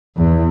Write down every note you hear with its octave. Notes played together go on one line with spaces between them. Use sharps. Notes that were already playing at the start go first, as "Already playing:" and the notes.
E2